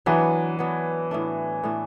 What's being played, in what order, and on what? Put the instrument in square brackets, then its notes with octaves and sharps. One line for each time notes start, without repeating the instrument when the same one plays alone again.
[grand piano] E3 [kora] F#3 B3 D4
[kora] F#3 B3 D4
A2 A3 D4
A2 A3 D4